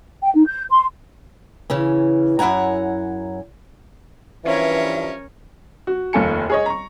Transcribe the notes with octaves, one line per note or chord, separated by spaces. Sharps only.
G5
D#4
G6
C6
C#3 E3 C#4
F#2 E4 F#5 G#5 A#5
G2 E3 F3 C#4 A#4 C#5 E5
F#4
F1 D#2 F4 A4 G#5 C#7
G#4 C#5 D#5
A#5 C#6